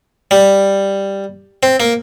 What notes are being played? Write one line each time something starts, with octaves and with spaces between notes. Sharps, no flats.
G3
C4
A#3